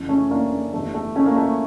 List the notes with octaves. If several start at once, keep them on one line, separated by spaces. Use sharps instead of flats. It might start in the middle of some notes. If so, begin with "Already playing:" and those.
Already playing: F1 F2 C#3 E3
A3 C#4
A#3 D4
A#3
G1 F2 E3 G3 A3
A3
A3 C#4
A#3
A3